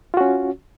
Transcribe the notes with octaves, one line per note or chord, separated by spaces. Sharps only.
C#4 F4 F#4